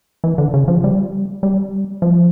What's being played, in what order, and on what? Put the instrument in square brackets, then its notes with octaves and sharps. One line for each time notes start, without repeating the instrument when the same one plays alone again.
[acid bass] E3
D3
C#3
F3
G3
G3
F3